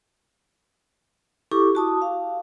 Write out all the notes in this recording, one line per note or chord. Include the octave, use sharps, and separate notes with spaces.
E4 G4 A4 C#6 D6
F#4 A5 D#6
F5